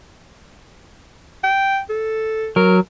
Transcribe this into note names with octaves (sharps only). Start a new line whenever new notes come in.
G5
A4
F#3 A#4